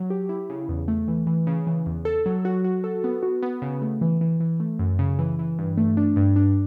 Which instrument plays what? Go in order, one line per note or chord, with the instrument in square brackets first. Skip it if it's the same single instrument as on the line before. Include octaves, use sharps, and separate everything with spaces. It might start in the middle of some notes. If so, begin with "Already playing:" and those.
Already playing: [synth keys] F#3
G4
E4
C#3
E2
A3
E3
E3
C#3
E3
E2
A4
F#3
F#4
F#4
A4
B3
F#4
B3
C#3
A3
E3
E3
E3
A3
F#2
C#3
E3
E3
G2
A3
D4
G2
D4